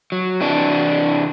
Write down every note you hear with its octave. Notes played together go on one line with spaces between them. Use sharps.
F#3
C3 E3 D4